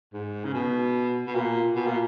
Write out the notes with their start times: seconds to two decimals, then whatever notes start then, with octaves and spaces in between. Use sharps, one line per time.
0.14 G#2
0.45 C#3
0.54 B2
1.27 B2
1.35 A#2
1.75 B2
1.86 A#2